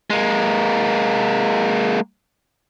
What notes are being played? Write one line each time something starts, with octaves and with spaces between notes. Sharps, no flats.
G#3 A#3